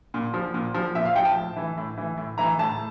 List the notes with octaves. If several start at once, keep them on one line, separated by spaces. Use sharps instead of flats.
A#2
F3
A#2
F3
A#2 E5
F5
F3 G5
A5
A2
E3
A2
E3
A2
E3 A#5
A2 A5